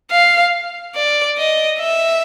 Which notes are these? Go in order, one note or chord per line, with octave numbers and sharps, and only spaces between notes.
F5
D5
D#5
E5